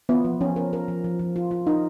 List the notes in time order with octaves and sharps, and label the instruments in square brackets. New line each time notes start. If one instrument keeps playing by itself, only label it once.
[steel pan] B3 [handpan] F4
[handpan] F3
[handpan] F3 [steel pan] C#4
[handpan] A#4
A#4
F3
F3
F3
F4
F4
[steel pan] D#4 [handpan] A#4